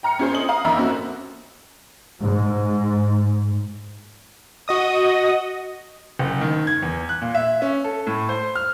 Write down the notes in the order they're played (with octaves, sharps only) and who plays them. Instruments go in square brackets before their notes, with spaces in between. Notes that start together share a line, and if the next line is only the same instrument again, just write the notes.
[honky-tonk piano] G5 A#5 F6 C#7
C#4 F4 G#4 C5 C#5
C4 A4 D#5 D#6 F#7
F5 A#5 D#6
F2 D#3 E5 A#5 B5 E6
A#3 C4 C#4 F#4 A4
[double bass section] G#2
[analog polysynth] F#4 D#5 D#6
[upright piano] F#1
D#3
G#6
E2
F#6
A#2
E5
C#4
A4
A2
C5
F6